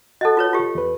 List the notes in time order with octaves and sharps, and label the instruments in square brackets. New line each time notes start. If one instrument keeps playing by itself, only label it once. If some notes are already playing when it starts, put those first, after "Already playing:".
[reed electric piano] F#4 F#5 A5 [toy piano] A4 D#5
[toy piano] F4 B4 C#5
F4 G4
[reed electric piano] E2 B4